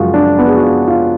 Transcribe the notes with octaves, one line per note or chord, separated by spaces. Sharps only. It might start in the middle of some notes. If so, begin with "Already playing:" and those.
Already playing: F#1 F#2 F3 G#3 F4 F#4 G#4
D4
B3
G#4
F#4
F4
F4